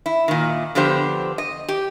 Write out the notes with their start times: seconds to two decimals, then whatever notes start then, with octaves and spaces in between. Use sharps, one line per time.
0.06 E4
0.28 A#2 D#3
0.75 D3 F3 B3 G4 C5
1.38 D#5
1.68 G4